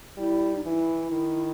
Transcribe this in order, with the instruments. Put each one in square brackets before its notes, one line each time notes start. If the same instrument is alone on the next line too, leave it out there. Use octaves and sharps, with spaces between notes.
[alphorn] G3 [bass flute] E4
[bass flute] D#4
[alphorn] E3 [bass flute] E4
[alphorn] D#3